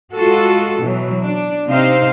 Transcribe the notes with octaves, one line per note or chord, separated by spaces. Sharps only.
G#3 F4 F#4 A4
B2 E3 F#3
D4
C3 C4 D#4 C5 F5